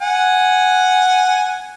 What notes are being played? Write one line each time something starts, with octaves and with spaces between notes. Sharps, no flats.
F#5 G#5